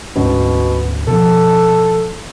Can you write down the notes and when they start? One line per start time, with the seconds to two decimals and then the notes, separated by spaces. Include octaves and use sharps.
0.16 D2 G#2 B2 C#4
1.07 B2 F3 A4